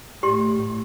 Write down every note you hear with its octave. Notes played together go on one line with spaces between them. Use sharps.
A2 G4 C6